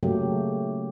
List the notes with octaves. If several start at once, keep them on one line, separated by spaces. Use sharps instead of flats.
C#3 F#3 A3 A#3 G4